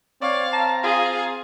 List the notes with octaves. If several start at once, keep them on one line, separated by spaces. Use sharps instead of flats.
C4 C#5 D5 F5
A5 A#5
F4 G#4 F5